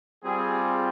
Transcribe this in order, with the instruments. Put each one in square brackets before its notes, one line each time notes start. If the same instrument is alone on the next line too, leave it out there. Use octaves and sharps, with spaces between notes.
[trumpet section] G3 C4 F4 G#4